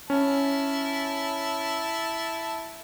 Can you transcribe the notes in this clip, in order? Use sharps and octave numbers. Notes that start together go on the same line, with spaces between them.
C#4 E4 A5